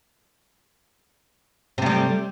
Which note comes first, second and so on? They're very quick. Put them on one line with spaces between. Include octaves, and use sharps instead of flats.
C3 A3 G3